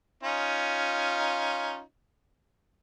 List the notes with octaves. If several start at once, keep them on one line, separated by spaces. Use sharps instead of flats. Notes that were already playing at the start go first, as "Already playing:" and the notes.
C#4 D#4 F4